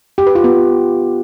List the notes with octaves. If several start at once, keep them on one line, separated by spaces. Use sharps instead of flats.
G4
B4
F4
B3